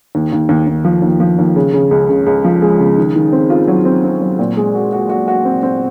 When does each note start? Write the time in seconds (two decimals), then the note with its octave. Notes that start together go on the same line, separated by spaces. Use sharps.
0.15 D#2
0.33 D#2
0.49 D#2
0.67 D#2
0.84 F3
1.02 D#2
1.20 F3
1.39 D#2
1.56 C#3
1.73 C#3
1.91 C#2
2.09 C#3
2.26 C#2
2.44 F3
2.62 G#3
2.80 C#3
2.98 D#3
3.16 D#3
3.33 C4
3.50 F4
3.68 F#3
3.85 C4
4.04 C4
4.21 F#3
4.39 A#2
4.57 G#3
4.75 F#4
4.93 F#4
5.09 F#4
5.28 F#4
5.45 C4
5.63 C4